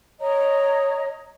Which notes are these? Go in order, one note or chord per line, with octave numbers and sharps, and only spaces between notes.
C#5 D#5 A#5